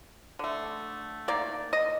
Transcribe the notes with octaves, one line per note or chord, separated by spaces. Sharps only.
D3 A3
D#3 A#3 D5
D#5